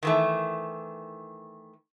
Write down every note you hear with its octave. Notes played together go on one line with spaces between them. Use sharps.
D#3 E3 A3